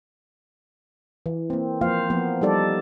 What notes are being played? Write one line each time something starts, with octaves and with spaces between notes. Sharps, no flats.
E3
A#3 C4
F3 A#3 F4 C5 F5
F3 A#3 B3
G3 D#4 A4 D5